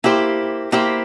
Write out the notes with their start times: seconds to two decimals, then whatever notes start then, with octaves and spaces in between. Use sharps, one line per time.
0.04 A#3 E4 G4 C5
0.72 A#3 E4 G4 C5